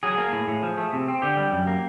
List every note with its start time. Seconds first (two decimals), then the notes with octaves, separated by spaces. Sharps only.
0.03 F#3 G#4
0.18 A#3
0.32 A2
0.48 A2
0.63 F3
0.78 A3
0.93 C3
1.08 C4
1.22 D3 G4
1.37 G3
1.52 F#2
1.67 A#3